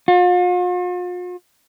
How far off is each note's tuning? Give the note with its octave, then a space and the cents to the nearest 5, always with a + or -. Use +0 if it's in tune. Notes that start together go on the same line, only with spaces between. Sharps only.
F4 +45